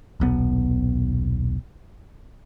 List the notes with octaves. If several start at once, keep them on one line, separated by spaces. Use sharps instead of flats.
D#1 B1 B3